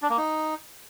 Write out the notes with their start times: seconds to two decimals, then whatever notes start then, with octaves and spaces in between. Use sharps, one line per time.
0.02 D4
0.10 A#3
0.17 D#4